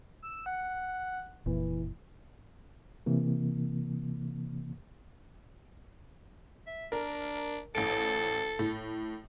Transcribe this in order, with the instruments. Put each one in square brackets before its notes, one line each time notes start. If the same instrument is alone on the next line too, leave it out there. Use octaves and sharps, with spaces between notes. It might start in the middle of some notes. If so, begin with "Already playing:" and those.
[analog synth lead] E6
F#5
[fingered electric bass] F1 A#2 [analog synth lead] E3
[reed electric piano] C3 E3 A#3
[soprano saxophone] E5
[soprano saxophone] D4 [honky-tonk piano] A#4
[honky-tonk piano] A1 D7 [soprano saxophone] A4
[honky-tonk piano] A2